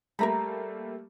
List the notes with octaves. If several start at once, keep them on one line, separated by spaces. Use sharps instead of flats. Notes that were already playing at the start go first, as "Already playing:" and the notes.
G3 A3 A#3 A#4 A#5 B5